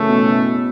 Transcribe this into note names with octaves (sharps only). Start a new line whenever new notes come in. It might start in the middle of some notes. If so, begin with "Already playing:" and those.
Already playing: F#2 C#3 E3 A3 C#4
B2